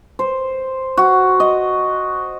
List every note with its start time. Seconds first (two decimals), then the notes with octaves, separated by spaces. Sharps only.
0.19 C5
0.97 F#4
1.40 D#5